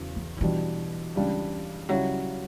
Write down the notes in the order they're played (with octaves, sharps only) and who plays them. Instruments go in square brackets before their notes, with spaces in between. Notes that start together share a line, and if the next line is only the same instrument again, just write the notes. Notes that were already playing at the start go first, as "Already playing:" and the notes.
Already playing: [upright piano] E2 C#3 F#3
[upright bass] E3
D3
[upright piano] B2 G3 D4 [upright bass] E3
[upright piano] C#2 C#3 G3 D4
[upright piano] C#3 G3 C#4 E4 [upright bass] F#3